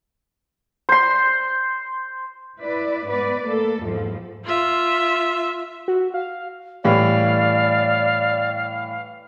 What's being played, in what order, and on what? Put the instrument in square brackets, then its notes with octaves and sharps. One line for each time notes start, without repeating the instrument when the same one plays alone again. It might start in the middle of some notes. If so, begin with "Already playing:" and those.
[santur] C5 C6
[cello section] E4 B4 D5
G#2 B3 B4 D5
A3 A#3 A4
E2 G#2 F3
[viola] F4 E5
[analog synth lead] F#4
F5
[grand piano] A2 E3 G3 [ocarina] D5 [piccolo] F5